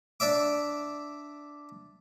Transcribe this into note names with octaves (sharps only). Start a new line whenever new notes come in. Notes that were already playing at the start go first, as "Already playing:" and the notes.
D4 D5 E5 D6